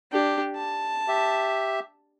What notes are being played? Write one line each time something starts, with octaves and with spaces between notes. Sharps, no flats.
D4 G4
A5
G4 E5